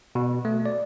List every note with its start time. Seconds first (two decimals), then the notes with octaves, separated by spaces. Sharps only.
0.15 B2
0.45 A3
0.66 D5